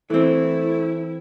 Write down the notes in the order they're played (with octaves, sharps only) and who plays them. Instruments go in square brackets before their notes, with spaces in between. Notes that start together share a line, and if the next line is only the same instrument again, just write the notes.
[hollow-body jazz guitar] E3 C4 [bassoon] A3 [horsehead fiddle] E4